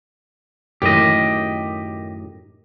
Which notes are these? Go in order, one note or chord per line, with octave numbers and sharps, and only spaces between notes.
F#2 A2 D#3 G4 D#5